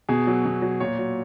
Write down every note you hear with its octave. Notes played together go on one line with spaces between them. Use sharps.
B2 G#4
F#3
B2
F#3
A#2 C#5
F#3